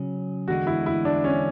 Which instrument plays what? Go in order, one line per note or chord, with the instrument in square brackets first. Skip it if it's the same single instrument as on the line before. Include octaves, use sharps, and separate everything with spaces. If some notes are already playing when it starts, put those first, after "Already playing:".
Already playing: [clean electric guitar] C#3 F#3 C#4
[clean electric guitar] E2 D3 G#3 [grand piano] F#4
[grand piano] E4
E4
D4
C#4